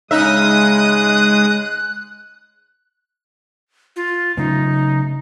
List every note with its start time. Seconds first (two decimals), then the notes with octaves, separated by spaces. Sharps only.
0.11 C#3 G#3 D#4 E5 D#6 F#6
3.96 F4
4.37 C#3 F#3 A3 D#4